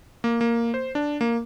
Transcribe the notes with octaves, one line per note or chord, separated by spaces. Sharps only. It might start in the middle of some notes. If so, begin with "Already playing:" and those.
A#3
A#3
C5
D4
A#3